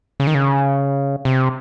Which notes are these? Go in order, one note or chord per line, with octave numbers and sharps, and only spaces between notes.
C#3
D#3
C#3
C3